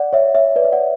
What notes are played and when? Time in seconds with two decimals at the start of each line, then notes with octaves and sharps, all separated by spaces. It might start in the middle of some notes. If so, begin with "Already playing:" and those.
Already playing: D5 F#5
0.13 C#5 E5
0.34 C#5 E5
0.56 B4 D5
0.64 E5
0.72 D5 F#5